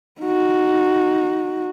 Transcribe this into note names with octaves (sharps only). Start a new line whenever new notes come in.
D#4 F#4